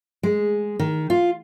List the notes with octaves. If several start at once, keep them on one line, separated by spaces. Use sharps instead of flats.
G#3
D#3
F4